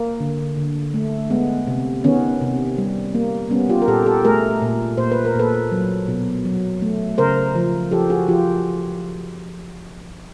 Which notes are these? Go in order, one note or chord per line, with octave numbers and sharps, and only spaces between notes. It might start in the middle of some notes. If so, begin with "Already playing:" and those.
Already playing: A#3
D3
D3
A3
G#3 B3
C3
D#3 B3 C#4
C3
G3
A#3
G3 B3 C#4
F4 G4
A#4
A#2 G4 A4
G4 A4
A3 G#4 A#4
A#2
A#2 C5
B4
A#4
A#2 A4 B4
F#3
B2
F#3
A3
C#3 A#4 C5
F3
F3 G4 A4
F#4 G#4
F3 F4 G4